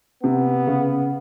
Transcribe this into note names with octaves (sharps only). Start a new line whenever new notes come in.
C3 B3
C#3